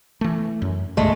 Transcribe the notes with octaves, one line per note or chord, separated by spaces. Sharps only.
E3 A3
F#2
C2 G2 C#3 G#3 A3